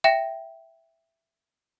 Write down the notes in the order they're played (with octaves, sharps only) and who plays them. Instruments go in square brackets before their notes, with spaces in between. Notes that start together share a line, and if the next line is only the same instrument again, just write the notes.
[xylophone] E5 G5 A#6 E7